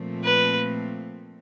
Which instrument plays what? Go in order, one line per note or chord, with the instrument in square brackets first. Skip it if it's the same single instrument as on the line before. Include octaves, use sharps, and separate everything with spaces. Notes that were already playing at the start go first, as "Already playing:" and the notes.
Already playing: [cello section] A#2 F3 A3 C4
[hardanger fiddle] B4